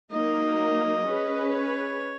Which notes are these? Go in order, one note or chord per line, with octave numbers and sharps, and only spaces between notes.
F#3 A#3 D#4 D#5
C#4 G#4 B4
C#5